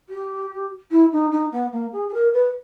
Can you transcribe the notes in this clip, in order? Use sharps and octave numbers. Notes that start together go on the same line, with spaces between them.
G4
E4
D#4
D#4
B3
A#3
G#4
G#4
A#4
B4